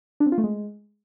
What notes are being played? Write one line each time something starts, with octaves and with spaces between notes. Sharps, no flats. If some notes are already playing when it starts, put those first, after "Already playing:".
D4
C4
F4
A3
G#3